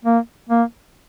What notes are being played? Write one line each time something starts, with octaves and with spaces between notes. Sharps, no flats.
A#3
A#3